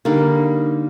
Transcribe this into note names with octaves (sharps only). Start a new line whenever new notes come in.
D3 G3 A#3 D#4